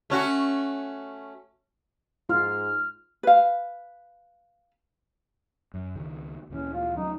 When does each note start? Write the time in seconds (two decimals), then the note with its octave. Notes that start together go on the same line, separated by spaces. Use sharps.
0.10 A3 C#4 F#4
2.29 G#2 F4 F6
3.23 B4 F5
5.74 F#2
5.96 C#2 D#3
6.50 D2 A#2 E3 C#4
6.74 F4
6.97 D2 F#3 C#4 D#4